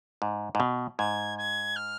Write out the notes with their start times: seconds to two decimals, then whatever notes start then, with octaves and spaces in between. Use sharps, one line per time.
0.22 G#2
0.55 G#2
0.60 B2
0.99 G#2 G#6
1.38 G#6
1.76 F6